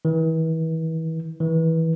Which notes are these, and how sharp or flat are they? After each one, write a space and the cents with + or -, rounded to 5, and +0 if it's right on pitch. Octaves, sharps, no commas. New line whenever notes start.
E3 -35
E3 -20